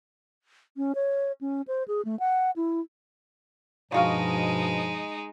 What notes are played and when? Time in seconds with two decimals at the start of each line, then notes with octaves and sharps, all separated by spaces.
0.77 C#4
0.95 C#5
1.41 C#4
1.68 C5
1.88 G#4
2.05 A3
2.19 F#5
2.56 E4
3.92 G2 B2 F3 G#3 D#4 F4 F#4 F5